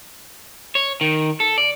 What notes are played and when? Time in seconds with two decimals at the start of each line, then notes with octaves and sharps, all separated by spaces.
0.75 C#5
1.01 D#3
1.40 A4
1.58 D5